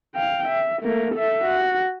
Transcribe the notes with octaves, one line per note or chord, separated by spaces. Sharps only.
F5 G5
E5
A3 A#3
A4 E5
F#4